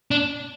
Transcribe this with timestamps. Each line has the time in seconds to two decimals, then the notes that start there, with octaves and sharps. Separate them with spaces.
0.11 D4